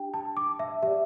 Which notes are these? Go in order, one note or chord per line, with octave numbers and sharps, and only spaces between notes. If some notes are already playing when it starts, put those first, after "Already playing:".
Already playing: D4 G4 G5
A5
D6
E5
G4 D5 E5